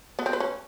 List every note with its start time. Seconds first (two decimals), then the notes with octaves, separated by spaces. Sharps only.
0.19 B3
0.26 C4
0.33 B4
0.40 C#4